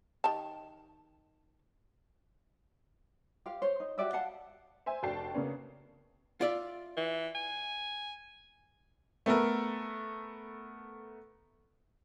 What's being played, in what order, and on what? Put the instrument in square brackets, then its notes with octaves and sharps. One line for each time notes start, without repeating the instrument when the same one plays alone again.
[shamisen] D#3 G4 A5
[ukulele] G4 C5 F5
C5 C#5
D#4
F#4 G4 D5 E5
F5 F#5 A5
[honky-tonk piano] C5 E5 G#5
F1 D4 F#4 G5 A5 C7
C#3 A#3 B3 C#4 D4
[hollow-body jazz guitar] F4 D5 E5
[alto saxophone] E3
G#5
[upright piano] A3 B3 A4 A#4